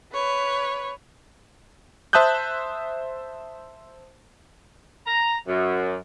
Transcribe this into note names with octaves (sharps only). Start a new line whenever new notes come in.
B4 C#5
C5 E5 A5 D#6 F#6 G6
A#5
F#2